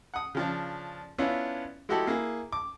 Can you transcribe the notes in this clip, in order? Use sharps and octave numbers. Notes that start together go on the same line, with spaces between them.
F#5 D#6
C#3 F3 D4
B3 C#4 D4 E4 F4
G#3 E4 F#4 G4 A4
A#3 E4 G#4
D6